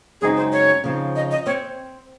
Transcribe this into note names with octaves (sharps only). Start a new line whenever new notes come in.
F#2 C#3 G#3 C4 D#4 G#4
C5
C#5
C#3 F3 C4 D#4
D#5
D#5
C4 C#5